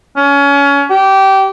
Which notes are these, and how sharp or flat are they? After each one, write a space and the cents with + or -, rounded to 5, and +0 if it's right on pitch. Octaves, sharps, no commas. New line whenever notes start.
C#4 +25
G4 -20